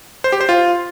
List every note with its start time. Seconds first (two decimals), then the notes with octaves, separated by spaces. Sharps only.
0.24 C5
0.32 G4
0.41 C5
0.49 F4